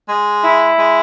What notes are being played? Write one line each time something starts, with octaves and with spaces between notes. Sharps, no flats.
G#3
E4
G#3